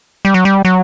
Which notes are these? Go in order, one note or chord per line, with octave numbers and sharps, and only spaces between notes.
G3
F#3
G3
F#3